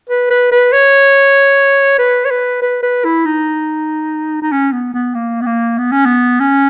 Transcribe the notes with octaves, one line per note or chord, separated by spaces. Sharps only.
B4
B4
B4
C#5
B4
C#5
B4
B4
B4
E4
D#4
D#4
C#4
B3
B3
A#3
B3
A#3
B3
C#4
B3
C#4